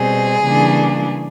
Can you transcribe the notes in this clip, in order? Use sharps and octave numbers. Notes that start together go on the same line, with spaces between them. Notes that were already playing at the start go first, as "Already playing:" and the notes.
Already playing: B2 G3 C4 G#4
C#3 E3 G3 A#3 D4